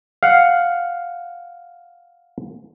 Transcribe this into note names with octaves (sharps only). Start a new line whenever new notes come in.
F5 F#5